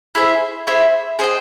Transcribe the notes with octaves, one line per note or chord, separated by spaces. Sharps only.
E4 G#4 C5 E5
E4 G#4 C5 E5
G#4 C5 D#5 G5